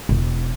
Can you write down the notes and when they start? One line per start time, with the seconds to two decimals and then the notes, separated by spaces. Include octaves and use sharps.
0.09 E1